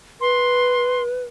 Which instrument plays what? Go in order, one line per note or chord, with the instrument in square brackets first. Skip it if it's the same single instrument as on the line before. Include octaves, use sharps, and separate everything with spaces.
[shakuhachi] B4 [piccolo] C6